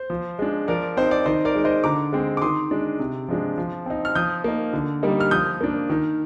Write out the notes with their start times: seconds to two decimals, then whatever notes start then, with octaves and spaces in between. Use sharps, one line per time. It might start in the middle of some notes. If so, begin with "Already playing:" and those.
Already playing: C5
0.10 F3
0.39 G#3 D4
0.68 F3 A#4 D5
0.97 C4 D#4 C5
1.11 D5
1.26 D#3 C5 D#5
1.45 A#4 D5
1.55 G#3 D#4
1.65 C5 D#5
1.84 D3 A#5 D6
2.13 G#3 C4
2.37 D6
2.42 D#3 C6 D#6
2.71 G#3 D4
2.99 C3
3.28 F3 G#3 D4
3.58 F3
3.86 C4 D#4
4.05 F6
4.15 F3 D#6 G6
4.44 A#3 D#4
4.73 D3
5.03 G3 A#3 D#4
5.20 F6
5.31 F3 D#6 G6
5.61 A#3 D4
5.90 D#3